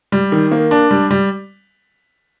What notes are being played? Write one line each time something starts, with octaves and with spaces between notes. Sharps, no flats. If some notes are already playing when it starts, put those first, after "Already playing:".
G3
D#3
A#3
D4
G3
G3